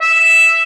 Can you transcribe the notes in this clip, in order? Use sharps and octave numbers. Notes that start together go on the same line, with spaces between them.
E5